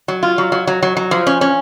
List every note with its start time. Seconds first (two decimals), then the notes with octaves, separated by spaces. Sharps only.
0.08 F#3
0.23 F4
0.38 F#3
0.52 F#3
0.67 F#3
0.83 F#3
0.97 F#3
1.11 F3
1.27 C#4
1.41 C#4